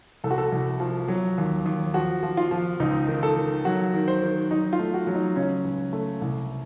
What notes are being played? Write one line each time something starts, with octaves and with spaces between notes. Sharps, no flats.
C2 A4
F#4
A4
C2
F3
F#3
D#2
D#2
F3 F#4
F3
F4
F3
C#2 D#4
D#3
A4
D#3
F#3 F#4
D#3
C5
D#3
F#3 D#4
F4
A3
F#4
F#3
D#4
C#3 C#4
C#2
A3
C2